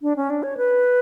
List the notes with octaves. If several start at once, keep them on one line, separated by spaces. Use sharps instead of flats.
D4
C#4
D4
C#5
B4